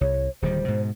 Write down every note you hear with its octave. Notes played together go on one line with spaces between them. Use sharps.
C2 C#5
D1 D#3 G3 C5
G#2 B2